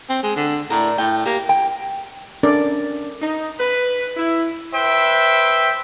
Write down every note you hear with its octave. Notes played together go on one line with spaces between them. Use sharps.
C4
G#3
D3
A2 A#4 D5
A2 G5
A#3 G4
G5
C#4 D4 A4 A#4 D5
D#4
B4
E4
B4 C5 E5 G5